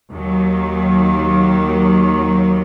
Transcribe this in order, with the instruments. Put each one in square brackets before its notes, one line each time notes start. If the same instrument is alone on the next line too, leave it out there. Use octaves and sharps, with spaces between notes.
[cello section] D#2 D#3 F#3